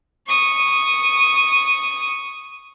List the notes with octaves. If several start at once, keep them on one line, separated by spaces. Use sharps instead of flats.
C#6 D#6